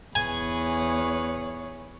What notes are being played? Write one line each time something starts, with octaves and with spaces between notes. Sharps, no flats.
E2 G#4 B4 C#5 G#5